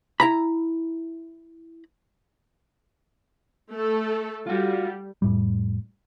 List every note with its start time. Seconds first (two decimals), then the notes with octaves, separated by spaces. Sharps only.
0.20 E4 A#5 B5
3.72 A3 A4
4.47 G3 F4 F#4
5.22 F2 A2 G3